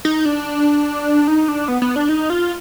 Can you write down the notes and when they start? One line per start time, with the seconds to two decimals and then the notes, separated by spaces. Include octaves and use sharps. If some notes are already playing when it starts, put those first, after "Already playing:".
0.05 D#4
0.26 D4
1.28 D#4
1.48 D4
1.68 B3
1.82 B3
1.96 D4
2.09 D#4
2.30 F4